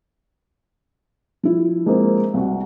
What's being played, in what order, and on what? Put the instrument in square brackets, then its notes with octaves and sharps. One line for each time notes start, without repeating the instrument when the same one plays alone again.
[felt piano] F3 E4
[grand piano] G#3 A#3 C4
C2 F#4